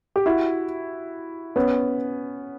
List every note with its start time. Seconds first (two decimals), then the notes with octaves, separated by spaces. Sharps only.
0.16 G4
0.26 E4 F#4
1.56 B3 C#4